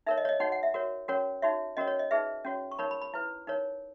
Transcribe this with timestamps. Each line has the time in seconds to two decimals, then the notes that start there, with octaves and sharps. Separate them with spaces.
0.07 D#4 A#4 C#5 E5
0.18 D#5
0.25 C#5
0.29 D#5
0.40 D#4 F#4 C#5 F#5
0.52 F#5
0.63 E5
0.74 F#4 A#4 C#5
1.08 C#4 F#4 A#4 C#5
1.42 D#4 F#4 C#5 E5
1.77 C#4 F#4 A#4 C#5 D#5
1.87 C#5
1.99 D#5
2.11 D#4 G#4 B4 E5
2.45 C#4 F#4 C#5
2.71 C#6
2.79 D#4 A#4 C#5 B5
2.91 B5
3.02 B5
3.14 E4 B4
3.47 D#4 A#4 C#5